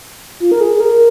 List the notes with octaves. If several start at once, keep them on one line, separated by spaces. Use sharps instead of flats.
F4
A#4
G#4
G#4
A#4